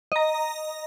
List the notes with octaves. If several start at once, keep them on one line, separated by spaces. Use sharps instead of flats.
D#5 A#5